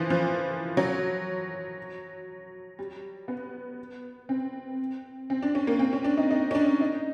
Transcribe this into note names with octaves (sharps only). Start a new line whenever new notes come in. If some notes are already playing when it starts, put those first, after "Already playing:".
Already playing: E3 F3
F3
F#3
G3
B3
C4
C4
D4
C#4
A#3
C4
C#4
D4
D#4
D#4
C#4
D4
D#4